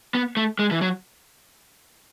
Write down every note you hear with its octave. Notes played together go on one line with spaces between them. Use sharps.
B3
A3
G#3
E3
F#3